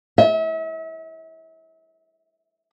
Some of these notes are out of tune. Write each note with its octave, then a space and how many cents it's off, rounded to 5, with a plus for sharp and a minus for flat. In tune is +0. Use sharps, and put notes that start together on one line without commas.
E5 -40